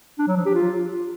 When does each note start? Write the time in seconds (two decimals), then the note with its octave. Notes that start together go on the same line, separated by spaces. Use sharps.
0.19 D4
0.28 F#3
0.37 F3
0.46 G4
0.55 F4